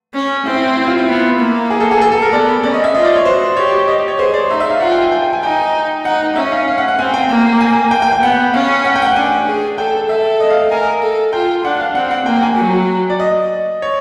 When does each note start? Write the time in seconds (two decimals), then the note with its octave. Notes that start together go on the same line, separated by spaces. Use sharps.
0.14 C#4
0.46 C4 E4
0.56 E4
0.77 E4
0.87 F4
0.98 E4
1.09 B3
1.39 A#3
1.70 G#4
1.80 A4
1.91 G#4
2.01 A4
2.12 A4
2.22 A#4
2.32 B3 D5
2.64 C#4 D5
2.74 D#5
2.84 E5
2.95 F4 D#5
3.05 D5
3.16 C#5
3.25 F#4 C5
3.57 G4 C#5
3.72 C#5
3.88 D#5
4.08 C#5
4.19 G#4 C5
4.34 D5
4.50 D#4 E5
4.60 E5
4.70 F5
4.80 F4 F#5
4.92 G5
5.02 G#5
5.12 G5
5.22 G5
5.33 G#5
5.43 D#4 G5
6.05 D#4 F#5
6.36 C#4 E5
6.52 F5
6.68 F5
6.78 F#5
6.88 F#5
6.99 C4 G#5
7.14 G5
7.29 A#3 G5
7.61 G#5
7.91 G5
8.02 G5
8.12 G5
8.23 B3 F#5
8.54 C#4 F5
8.85 F#5
8.96 G5
9.02 F#5
9.06 G5
9.16 D4 G#5
9.46 G#4
9.78 A4 G5
10.09 A4 E5
10.40 D#5
10.50 F5
10.71 A#4 G#5
11.03 A4
11.33 F4 G5
11.65 D4 F#5
11.80 F5
11.95 C4 F#5
12.11 F#5
12.26 A#3 G5
12.43 G#5
12.57 F#3
13.10 D5
13.20 D#5
13.82 C#5